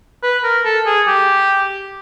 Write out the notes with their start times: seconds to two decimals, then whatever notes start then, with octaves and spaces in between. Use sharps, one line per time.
0.23 B4
0.44 A#4
0.65 A4
0.87 G#4
1.08 G4